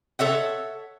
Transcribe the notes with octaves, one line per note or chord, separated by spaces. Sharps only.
A4 C#5 E5 F#5